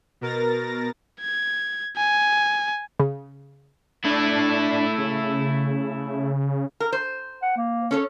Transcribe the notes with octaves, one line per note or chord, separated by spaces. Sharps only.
B2 A#4 A6 A#6
G#6
G#5
C#3
A3 D4 E4
C#3
A#4
C5
F#5
A#3
C#4 A4 C#5